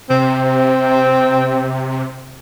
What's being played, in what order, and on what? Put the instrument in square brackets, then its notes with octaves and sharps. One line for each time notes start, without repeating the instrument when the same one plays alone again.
[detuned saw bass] C3 [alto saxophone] C4